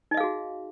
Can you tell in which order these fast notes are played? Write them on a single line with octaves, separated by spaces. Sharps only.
D#4 D#5 F5 G#4 F#4